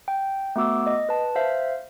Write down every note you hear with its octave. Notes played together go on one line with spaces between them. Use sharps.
G5
A3 B3 F#4 D6 E6
D#5
B4 A5
C5 E5 F5